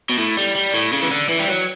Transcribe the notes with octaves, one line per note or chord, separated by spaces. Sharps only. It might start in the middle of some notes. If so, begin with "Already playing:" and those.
B2
A2
G3
G3
A2
C#3
E3
D3
E3
G3
F#3